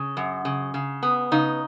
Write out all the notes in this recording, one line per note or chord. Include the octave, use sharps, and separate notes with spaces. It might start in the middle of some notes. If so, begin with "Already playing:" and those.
Already playing: C#3
F#2
C#3
C#3
B3
C#3 D#4